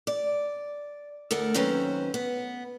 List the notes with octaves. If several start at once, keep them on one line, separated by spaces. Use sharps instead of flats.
D5
D2 A4 A#4 F#5
D#2 F#3 C4 C#4 B4 C5
B3